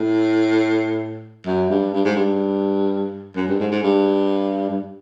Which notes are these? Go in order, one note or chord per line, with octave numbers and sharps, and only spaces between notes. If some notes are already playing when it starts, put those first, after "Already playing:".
Already playing: A2
F#2
G2
G2
G#2
G2
F#2
G2
G#2
G#2
G2
G2